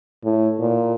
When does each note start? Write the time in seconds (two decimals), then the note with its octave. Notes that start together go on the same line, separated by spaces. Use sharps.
0.24 A2
0.60 A#2